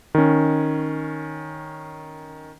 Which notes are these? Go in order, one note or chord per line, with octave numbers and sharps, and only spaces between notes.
D#3 C#4